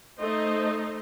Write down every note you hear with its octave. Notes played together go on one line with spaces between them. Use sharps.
A3 D#4 C5 D#5